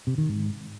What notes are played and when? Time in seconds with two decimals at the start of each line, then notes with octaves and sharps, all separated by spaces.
0.07 C3
0.18 D#3
0.29 G#2